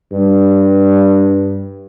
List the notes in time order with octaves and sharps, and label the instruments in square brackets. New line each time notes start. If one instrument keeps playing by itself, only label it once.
[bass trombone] G2